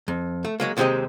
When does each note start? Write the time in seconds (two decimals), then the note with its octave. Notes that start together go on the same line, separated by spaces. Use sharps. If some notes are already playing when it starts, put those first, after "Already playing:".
0.08 F2
0.45 A3
0.60 F#3 G#3 A#3
0.77 D#2 C3 G#3 C4 G4 D#5